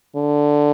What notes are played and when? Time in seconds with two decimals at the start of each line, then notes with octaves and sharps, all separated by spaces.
0.16 D3